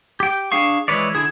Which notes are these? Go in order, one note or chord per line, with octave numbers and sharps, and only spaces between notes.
G4 G5
D4 G#4 F5 C#6
E3 G#3 B4 C#5 D5
D3 E4 G#4